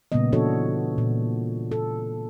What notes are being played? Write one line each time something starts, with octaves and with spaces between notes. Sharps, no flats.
A#2 C#3 G3 A#3 B3 D#5
E3 B3 D4 F#4 A4 C#5
A#2
A4